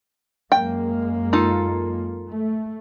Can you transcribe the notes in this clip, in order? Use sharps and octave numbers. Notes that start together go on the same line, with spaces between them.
F#2 G#3 A#3 G5
D#4 F4 A4
A3